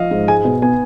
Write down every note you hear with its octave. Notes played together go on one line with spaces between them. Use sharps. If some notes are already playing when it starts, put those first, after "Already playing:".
Already playing: F3 D#5 F5
G#2
G#3 G#5
B2
B3 G#5